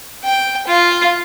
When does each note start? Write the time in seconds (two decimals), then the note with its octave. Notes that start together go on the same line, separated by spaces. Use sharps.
0.24 G5
0.67 F4